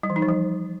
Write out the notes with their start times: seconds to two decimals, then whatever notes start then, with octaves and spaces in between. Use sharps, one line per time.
0.03 G3
0.10 E3
0.16 D#4
0.22 F3
0.29 G3